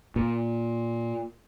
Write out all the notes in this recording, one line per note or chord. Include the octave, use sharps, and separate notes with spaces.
A#2